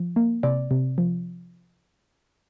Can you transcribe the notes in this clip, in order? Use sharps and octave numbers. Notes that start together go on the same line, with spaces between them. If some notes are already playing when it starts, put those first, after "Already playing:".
Already playing: F3
A#3
C3 D5
C3
F3